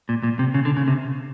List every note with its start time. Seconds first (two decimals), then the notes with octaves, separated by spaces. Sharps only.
0.09 A#2
0.23 A#2
0.39 C3
0.54 C#3
0.65 D3
0.77 C#3
0.88 C3